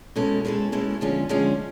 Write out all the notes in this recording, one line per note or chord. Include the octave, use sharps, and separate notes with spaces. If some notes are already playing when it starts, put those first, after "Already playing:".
B2 G#3 C#4 E4 A4
B2 G#3 C#4 E4 A4
B2 G#3 C#4 E4 A4
D3 F3 G#3 C#4
D3 F3 G#3 C#4